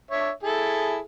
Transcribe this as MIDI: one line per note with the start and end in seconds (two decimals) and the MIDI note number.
0.11 0.30 62
0.11 0.30 73
0.11 0.30 76
0.43 1.00 64
0.43 1.00 68
0.43 1.00 69